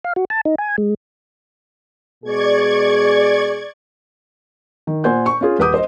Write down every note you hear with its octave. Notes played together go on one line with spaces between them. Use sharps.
F5
F#4
A5
D#4
G#5
G#3
B2 G#3 G#4 D5 C#6 G#6
D#3
A#2 C5 F#5 G#5 C6 G6
C#6
C#4 F4 G#4
D#1 B4 F#5 D6 D#6 G6
C5 D#5